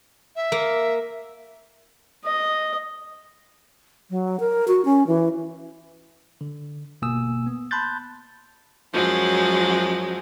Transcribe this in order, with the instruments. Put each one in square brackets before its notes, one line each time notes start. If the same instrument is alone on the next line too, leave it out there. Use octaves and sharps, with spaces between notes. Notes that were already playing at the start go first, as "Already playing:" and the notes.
[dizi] E5
[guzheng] A#3
[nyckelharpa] D#5
[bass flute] F#3
A#4
F#4
C#4
E3
[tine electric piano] D3
G1 B2 A#3 G#5 D#6 E6
B3
A5 B5 C6 F#6 G6 A6
[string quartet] F#2 F3 F#3 G#3